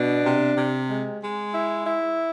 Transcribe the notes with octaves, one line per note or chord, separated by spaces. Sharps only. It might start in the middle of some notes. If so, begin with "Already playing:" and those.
Already playing: B2 D4
C3
C3
G#3
G#3
E4
E4